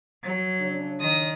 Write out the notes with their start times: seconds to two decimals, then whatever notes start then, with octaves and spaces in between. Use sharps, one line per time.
0.23 F#3
0.60 C#3 D4
1.00 D#3 D#6